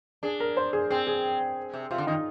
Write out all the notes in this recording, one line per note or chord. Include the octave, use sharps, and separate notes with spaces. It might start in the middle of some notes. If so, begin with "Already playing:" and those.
D4 G#4
A#4
C5
G#4
C4 G#4
G#4
C3
C3 F4
D3
D#3 D#4